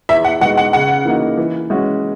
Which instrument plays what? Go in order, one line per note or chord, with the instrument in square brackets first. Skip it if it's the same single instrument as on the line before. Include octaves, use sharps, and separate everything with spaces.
[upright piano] E2 [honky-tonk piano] E5
[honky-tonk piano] F#5
[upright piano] B2 G#3 D#4 F#4 [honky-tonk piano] F#5
[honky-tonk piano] F#5
[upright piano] C#3 [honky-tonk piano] F#5
[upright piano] E3 A#3 D#4 F#4
E3
G#3 C#4 F#4